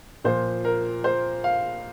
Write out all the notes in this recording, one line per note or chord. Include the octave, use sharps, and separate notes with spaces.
A#2 F3 C5
A#4
C5
F5